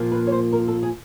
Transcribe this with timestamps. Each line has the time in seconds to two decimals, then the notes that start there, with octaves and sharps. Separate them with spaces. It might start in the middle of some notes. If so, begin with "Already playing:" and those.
Already playing: A#2 F3 A#3
0.12 B4
0.27 C#5
0.32 C5
0.52 A#4
0.68 A4
0.83 G#4